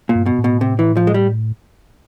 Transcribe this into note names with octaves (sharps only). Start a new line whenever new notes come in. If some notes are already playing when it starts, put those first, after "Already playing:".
A#2
G2
B2
A2
B2
C3
E3
F3
G#3
G3